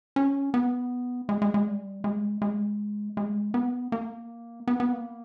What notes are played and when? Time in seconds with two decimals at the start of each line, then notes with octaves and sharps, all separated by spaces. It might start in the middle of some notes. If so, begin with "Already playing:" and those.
0.16 C#4
0.54 B3
1.29 G#3
1.42 G#3
1.54 G#3
1.67 G3
2.04 G#3
2.42 G#3
3.17 G#3
3.54 B3
3.92 A#3
4.68 B3
4.80 B3
4.92 A#3